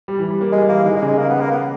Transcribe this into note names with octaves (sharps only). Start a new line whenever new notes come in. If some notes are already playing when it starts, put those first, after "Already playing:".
G3
E3
G3
A#3
G3 G#3
E3 A#3
D#3 G#3
G#3
C#3
G#3
A#3
B3
A#3
B3